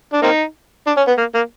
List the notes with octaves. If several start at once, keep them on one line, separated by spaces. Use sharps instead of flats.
D4
A#3 C4 D#4
D4
C#4
B3
A#3
A#3